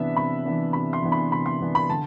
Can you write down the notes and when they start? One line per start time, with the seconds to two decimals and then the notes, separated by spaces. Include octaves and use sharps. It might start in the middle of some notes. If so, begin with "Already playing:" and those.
Already playing: C3 E3 B3 D4 E5
0.16 C3 B5
0.45 E3 B3 D4
0.73 C3 B5
0.93 C6
1.02 E3 B3 D4
1.12 B5
1.31 C3 B5
1.46 C6
1.61 E3 B3 D4
1.75 B5
1.89 D3 A5